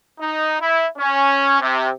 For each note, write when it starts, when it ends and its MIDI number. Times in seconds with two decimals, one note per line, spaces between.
0.20 0.56 63
0.61 0.85 64
0.98 1.60 61
1.61 1.89 48